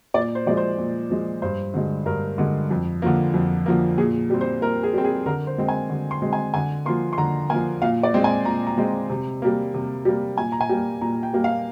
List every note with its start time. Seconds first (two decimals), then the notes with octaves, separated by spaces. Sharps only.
0.14 A#2 D5
0.35 C5
0.46 F3 G#3 D5
0.57 C5
0.78 A#2
1.10 F3 G#3
1.42 G2 C5
1.74 D3 G#3
2.06 G2 A#4
2.38 D3 G#3
2.71 F2
3.02 D3 F3 A#3
3.34 F2
3.66 D3 F3 A#3
3.98 A#2 G#4
4.30 G3 C4
4.41 C5
4.62 A#2 A#4
4.83 G#4
4.93 G3 C4
5.04 G#4
5.26 D3 A#4
5.47 C5
5.58 G#3 C4
5.68 G#5
5.90 D3
6.11 C6
6.22 G#3 C4
6.33 G#5
6.54 D3 G#5
6.86 F3 A#3 C6
7.13 C6
7.18 D3 A#5
7.50 A#3 G#5
7.55 F3
7.82 A#2 F5
8.03 D5
8.14 G#3 C4
8.24 G#5
8.45 A#2 A#5
8.67 A#5
8.78 G#3 C4
9.10 C3
9.42 G3 A#3
9.74 C3
10.05 G3 A#3
10.38 A#2 G#5
10.52 A#5
10.61 G#5
10.69 G3 A#3 G5
11.01 A#2 A#5
11.23 G5
11.34 G3 A#3
11.44 F5